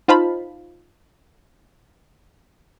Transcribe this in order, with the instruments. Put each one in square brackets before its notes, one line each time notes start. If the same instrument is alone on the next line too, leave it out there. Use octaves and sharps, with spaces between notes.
[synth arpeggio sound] D#4 F4 C5 F5 A5 B5